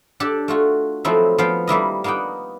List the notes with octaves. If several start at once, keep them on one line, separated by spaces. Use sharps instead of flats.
D4 G4 A4 D5
A3 F4 F#4
F3 F#3 A3 C4 D#4 E4
F3 B3 F5 G5
G3 A#3 E4 D#5
A#3 B3 D#4 F#5 G5